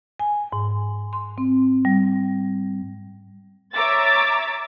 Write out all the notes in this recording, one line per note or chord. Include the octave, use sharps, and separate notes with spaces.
G#5
G#2
C6
C4
G3
C#5 E5 A#5 D6 E6 A6